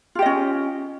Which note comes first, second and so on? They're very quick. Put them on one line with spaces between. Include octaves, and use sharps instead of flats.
F4 G4 D#5 C#4